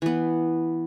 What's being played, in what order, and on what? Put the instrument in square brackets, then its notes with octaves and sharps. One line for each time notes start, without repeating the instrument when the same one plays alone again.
[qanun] E3 B3